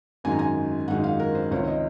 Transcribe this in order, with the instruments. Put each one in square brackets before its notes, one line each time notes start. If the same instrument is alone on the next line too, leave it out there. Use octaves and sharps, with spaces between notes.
[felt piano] G#1 F#2 D#3 G#3 D#4 G#5
A#5
G#5
G#1 F#2 D#3 G#3 D#4 F#5
F5
A#4
C5
C#2 C3 D#3 C#5
D#5